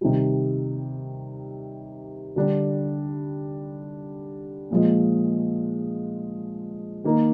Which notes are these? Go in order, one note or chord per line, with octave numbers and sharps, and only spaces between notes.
C3 D#3 G3
D3 G3 D4
A#2 F3 G#3
D#3 A#3 D#4